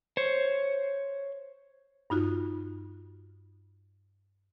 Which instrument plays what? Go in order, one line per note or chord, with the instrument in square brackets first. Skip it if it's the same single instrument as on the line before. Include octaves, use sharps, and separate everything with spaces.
[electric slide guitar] C5 C#5
[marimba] G2 D#4 F4 F#4